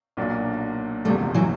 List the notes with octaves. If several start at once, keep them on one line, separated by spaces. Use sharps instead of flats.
B1 A#2 F#3 A#3 D4
F#1 E2 C3 F3 G3 A3
E3 F#3